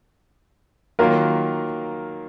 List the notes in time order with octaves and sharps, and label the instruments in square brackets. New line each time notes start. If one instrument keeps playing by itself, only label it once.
[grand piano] D#3 F#3 A#3 F4 A#4